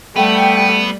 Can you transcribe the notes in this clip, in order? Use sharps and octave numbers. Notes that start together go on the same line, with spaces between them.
G3 A3 B3 G5